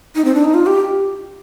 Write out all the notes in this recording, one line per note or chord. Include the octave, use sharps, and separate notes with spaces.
D#4
C4
D4
D#4
F4
G4